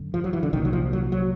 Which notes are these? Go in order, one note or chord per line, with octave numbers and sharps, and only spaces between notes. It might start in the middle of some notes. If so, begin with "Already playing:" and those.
Already playing: F#2 D3
F3
F#3
E3
D3
C2 A#2 D#3
F#3
F3
F#3
F#3